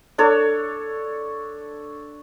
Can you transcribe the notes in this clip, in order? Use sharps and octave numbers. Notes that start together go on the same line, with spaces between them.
D4 A4 C#5